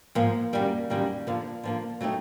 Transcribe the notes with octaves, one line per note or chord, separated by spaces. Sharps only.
G#2 F3 A#3
F#2 D#3 G3 A#3
F#2 D#3 G3 A#3
D3 F3 A#3
D3 F3 A#3
F#3 A3 C4 D#4